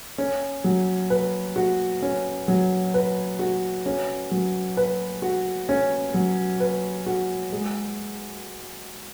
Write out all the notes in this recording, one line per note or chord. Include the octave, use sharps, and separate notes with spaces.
C#4
F#3
B4
F#4
C#4
F#3
B4
F#4
C#4
F#3
B4
F#4
C#4
F#3
B4
F#4
G#3